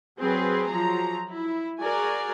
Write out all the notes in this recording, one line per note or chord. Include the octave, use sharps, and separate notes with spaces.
F#3 C4 G#4 B4
F3 F#3 A#5
E4
F#4 G#4 A#4 D5 G#5